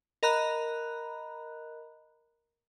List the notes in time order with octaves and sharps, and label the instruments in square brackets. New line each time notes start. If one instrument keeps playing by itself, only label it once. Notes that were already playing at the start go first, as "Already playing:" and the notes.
[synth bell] A#4 D#5 A#5 B5 F#6